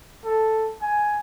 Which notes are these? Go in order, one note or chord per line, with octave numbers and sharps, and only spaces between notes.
A4
G#5